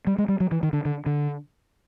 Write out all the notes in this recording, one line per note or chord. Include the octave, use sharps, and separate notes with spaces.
G3
G#3
G3
F#3
E3
D#3
D3
D3
D3